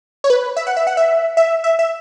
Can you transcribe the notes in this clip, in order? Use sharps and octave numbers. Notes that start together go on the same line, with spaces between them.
C#5
B4
E5
F#5
E5
F#5
E5
E5
E5
E5